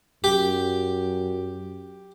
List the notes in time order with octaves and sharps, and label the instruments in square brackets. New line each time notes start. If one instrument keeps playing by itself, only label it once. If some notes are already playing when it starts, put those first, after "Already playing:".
[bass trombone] F#2 [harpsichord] G4